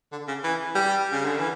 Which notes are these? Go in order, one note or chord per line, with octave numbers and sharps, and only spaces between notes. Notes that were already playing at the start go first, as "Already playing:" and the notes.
D3
C#3
E3
G3
C#3
D3
E3